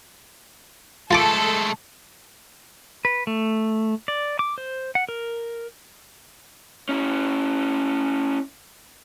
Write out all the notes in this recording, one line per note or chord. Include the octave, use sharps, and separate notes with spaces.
G#3 A3 F4 A4 A5 D6
B4
A3
D5
D6
C5
F#5
A#4
C#4 E4